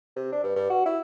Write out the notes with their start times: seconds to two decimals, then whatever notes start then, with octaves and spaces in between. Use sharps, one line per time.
0.16 C3
0.32 D4
0.44 G2
0.56 G2
0.70 F#4
0.85 E4